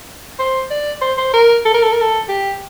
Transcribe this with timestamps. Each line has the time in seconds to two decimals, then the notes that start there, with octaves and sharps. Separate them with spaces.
0.39 C5
0.70 D5
1.01 C5
1.18 C5
1.33 A#4
1.65 A4
1.74 A#4
1.82 A4
1.92 A#4
2.01 A4
2.29 G4